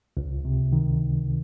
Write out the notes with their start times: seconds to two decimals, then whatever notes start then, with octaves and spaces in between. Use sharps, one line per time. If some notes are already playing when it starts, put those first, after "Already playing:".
0.17 C#2
0.45 C3
0.73 D#3